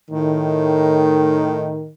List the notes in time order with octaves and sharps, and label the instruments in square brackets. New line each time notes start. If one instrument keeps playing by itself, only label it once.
[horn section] A2 D#3